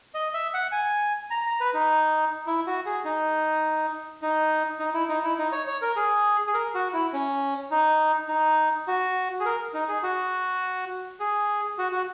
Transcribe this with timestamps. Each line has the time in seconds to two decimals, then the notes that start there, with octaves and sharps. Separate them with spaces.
0.14 D#5
0.34 E5
0.54 F#5
0.72 G#5
1.31 A#5
1.46 A#5
1.60 B4
1.74 D#4
2.47 E4
2.67 F#4
2.86 G#4
3.05 D#4
4.22 D#4
4.80 D#4
4.94 E4
5.09 D#4
5.24 E4
5.38 D#4
5.52 C#5
5.67 C#5
5.82 A#4
5.96 G#4
6.47 G#4
6.54 A#4
6.75 F#4
6.93 E4
7.13 C#4
7.71 D#4
8.28 D#4
8.88 F#4
9.40 G#4
9.46 A#4
9.74 D#4
9.88 G#4
10.03 F#4
11.20 G#4
11.78 F#4
11.92 F#4